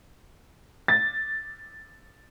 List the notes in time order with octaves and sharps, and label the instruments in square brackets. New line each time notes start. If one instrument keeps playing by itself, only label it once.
[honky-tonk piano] A6